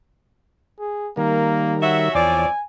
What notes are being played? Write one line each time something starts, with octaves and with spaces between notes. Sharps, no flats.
G#4
D#3 G3 A#3 A#4
F#4 C#5 E5 F#5
E2 F3 C4 C#5 D5 G#5